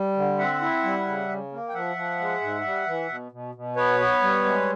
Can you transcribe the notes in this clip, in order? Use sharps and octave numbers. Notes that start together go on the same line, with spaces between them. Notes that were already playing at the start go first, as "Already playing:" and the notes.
Already playing: G3
D3
C4 E5 F#5
E4
G3
C#3
C#3
A#3
G5
F3 E5 F#5
F3
G#3
G#2
G3
E3
B2
B2
B2
B3 B4 C#5
B3
G3
G#3